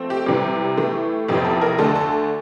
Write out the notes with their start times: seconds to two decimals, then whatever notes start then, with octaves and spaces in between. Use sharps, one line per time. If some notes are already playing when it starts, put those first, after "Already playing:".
Already playing: F3 A3 C4
0.10 G4
0.26 C2 C3 E3 G3
0.77 A2 E3 A3
1.28 G1 F2 C3 E3 G4
1.45 A4
1.61 A#4
1.78 D2 D3 A3 A4
1.95 A4